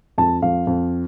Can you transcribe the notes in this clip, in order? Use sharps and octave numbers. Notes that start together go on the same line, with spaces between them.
F2 A5
F2 F5
F2